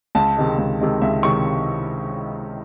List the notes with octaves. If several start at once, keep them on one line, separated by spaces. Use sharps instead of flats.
C#2 A5
C3 D#3 G#3
C#2
C3 D#3 G#3
C#2 E5
C3 D#3 G#3 C#6